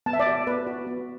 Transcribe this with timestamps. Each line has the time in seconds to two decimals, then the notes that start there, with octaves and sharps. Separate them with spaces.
0.06 B3 A5
0.13 E5
0.20 D5
0.26 F#4
0.47 B3 B4
0.67 F#4
0.87 B3